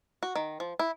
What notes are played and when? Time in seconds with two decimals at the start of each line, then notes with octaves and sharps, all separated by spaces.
0.23 F#4
0.35 D#3
0.60 F3
0.79 E4